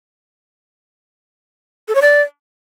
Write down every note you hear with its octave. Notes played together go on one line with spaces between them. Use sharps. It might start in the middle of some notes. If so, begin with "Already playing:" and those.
A4
C#5
D5